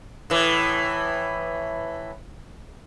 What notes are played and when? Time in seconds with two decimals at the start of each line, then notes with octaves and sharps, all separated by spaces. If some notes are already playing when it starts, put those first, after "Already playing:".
0.30 A2 E3